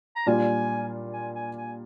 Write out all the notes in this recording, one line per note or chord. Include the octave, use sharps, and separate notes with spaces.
A#5
A#2 G3 D4 F4 G#5
G#5
G#5
G#5